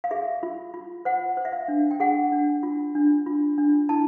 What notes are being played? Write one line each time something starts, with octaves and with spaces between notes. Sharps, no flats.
F5
G#4 E5
F4
F4
C5 F#5
C5
E5
F5
D4
G5
G#4 F#5
D4
F4
D4
F4
D4
E4 A5